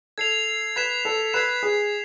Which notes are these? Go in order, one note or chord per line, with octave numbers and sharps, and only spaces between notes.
A4 G#6 C7 F7
B4 G#6 B6 E7
A4
B4 G#6 C7 E7
G#4